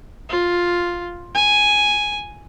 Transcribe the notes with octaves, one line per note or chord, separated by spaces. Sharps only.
F4
G#5